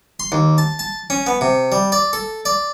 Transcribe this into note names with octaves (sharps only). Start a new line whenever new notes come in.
C6
D#2
A5
A5
C#4
B3
C3
G3
D5
A4
D5